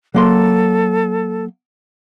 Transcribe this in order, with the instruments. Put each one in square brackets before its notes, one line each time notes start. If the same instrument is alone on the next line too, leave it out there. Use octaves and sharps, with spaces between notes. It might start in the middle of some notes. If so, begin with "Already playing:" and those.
[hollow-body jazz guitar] F#3 A#3 C6 [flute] A4